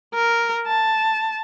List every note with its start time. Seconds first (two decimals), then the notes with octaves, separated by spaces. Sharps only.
0.15 A#4
0.67 A5